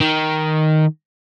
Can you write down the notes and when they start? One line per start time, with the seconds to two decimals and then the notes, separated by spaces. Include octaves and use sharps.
0.01 D#3